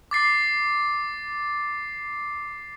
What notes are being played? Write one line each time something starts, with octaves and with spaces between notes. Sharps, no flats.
D6 A6 C7